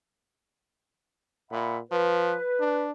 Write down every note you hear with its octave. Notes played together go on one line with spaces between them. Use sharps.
A#2 E5 F#5 B5
F3 B4
D4